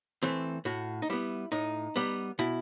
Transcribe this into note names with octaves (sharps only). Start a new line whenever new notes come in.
E3 A3 C4
A2 F#4
D#4
G3 B3 E4
A2 D#4
G3 B3
B2 E4